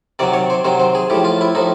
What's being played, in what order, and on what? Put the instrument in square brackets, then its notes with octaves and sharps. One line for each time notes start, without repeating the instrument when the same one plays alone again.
[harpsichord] C3 D#3 F#3 D5
C#5
C5
C3 D#3 F#3 C5
C5
G#4
A2 F3 G4
F4
E4
A2 F3 D#4